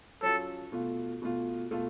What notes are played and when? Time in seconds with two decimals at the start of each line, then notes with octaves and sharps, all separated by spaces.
0.22 F#3 C#4 F4 A4
0.72 B2 A3 F4
1.22 B2 A3 F4
1.71 B2 A3 F4 A4